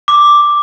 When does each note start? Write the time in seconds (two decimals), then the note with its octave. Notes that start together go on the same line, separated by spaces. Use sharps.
0.08 D6